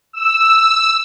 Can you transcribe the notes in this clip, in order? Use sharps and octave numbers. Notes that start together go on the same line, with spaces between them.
E6